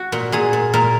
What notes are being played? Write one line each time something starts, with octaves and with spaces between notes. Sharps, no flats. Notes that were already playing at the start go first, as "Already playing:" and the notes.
Already playing: F#4
A#2
A#2 G#4
A#2
A#2 A#4